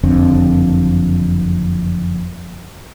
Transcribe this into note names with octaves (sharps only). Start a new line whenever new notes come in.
F#1 F2 D3 C4